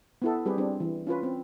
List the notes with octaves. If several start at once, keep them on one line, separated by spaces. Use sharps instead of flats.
B3 E4 A4
G3 C4 G4 G#4 B4
G3 C4 D4
E3
C#4 F4 B4
C4